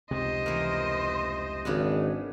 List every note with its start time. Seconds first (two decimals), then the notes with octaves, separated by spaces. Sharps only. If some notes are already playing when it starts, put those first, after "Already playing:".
0.11 F1 C#2 C3 C5 D#5
0.46 E3 A#3
1.65 G#1 C#3 B3 D4